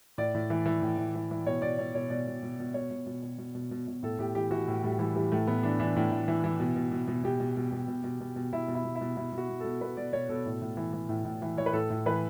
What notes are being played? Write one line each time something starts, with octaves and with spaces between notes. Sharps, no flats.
A2 D5
A2
E3
E3
A2
A2
E3
E3
B2 C#5
B2 D5
B2 C#5
B2 C#5
B2 D5
B2
B2
B2
B2 C#5
B2
B2
B2
B2
B2
B2
B2
A2 A4
A2 G4
E3 G4
E3 F#4
A2
A2 G3
E3 G3
E3 G3
A2 A3
A2 B3
E3 D4
E3 D4
A2
A2
E3
E3
B2
B2
B2
B2
B2 G4
B2
B2
B2
B2
B2
B2
B2
B2 E4
B2
E4
B2
E4
B2
B2 E4
B2
F#4
B2
B2 A4
B2 B4
B2 D5
B2 C#5
B2 A4
A2
A2
E3
E3
A2
A2
E3
E3 C#5
B4
A2 A4
A2
E3 B4